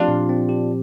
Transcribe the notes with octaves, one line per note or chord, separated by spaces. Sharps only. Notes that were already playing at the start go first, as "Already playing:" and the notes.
Already playing: F3 C4 D4 F4 G4
A#2
C4
G4